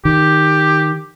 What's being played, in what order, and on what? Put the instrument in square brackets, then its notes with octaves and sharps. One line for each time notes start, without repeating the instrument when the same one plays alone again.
[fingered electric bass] D#3 [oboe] G4